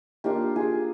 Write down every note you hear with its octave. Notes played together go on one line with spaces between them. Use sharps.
A#3 D4 F4 G4
F4 G#4